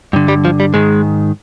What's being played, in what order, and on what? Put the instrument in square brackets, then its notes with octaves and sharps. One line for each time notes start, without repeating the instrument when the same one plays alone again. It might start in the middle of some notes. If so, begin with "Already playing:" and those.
[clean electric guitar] G2 D3
G3
F3
G3
G#2 D#3 G#3